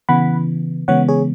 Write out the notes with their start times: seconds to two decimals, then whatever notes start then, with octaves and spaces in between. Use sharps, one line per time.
0.09 C#3 E3 B3 F#5 B5
0.88 C#3 E3 G#3 B3 C#5 F#5
1.08 G#4 C#5